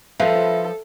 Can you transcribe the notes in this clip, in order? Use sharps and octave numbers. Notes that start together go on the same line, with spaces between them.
F3 A4 B4 E5 F5